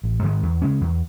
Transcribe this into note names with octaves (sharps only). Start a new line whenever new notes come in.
A1
G#2 D#3 G#3
E2
C#3 G#3 C#4
E2